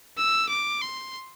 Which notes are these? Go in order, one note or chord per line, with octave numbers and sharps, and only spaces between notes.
E6
D6
C6